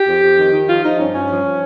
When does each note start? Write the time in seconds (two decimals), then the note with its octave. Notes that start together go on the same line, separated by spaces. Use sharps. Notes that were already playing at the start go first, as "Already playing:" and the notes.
Already playing: G4
0.08 F2
0.23 F2
0.38 D#3
0.52 D#3
0.68 F3 F4
0.83 F3 D#4
0.98 G2 C#4
1.13 G2 C#4
1.28 F3
1.44 F3